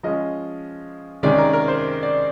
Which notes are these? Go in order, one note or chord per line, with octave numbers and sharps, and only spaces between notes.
F3 G#3 C#4 D#5
C3 D#3 G#3 C#4 D5
A#4
A#4
C5
D5